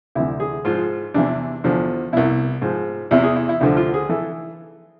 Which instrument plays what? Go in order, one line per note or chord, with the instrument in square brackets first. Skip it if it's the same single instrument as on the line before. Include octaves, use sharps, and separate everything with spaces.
[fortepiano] D2 C3 E3 E4
G#4
G#2 F3 F4
E2 C3 E3 D4
E2 D3 F3
C2 B2 E4
G#2 F3
E2 C3 E3 E4
G#4
E4
E4
D2 D3 F3 E4
F4
G#4
E3 A4